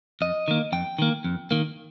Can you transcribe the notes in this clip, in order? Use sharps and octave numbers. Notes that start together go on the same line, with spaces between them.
F2 D#5
D#3 A#3
F2 G5
D#3 A#3
F2
D#3 A#3